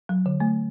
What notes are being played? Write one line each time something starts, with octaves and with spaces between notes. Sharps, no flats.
F#3
D3
A3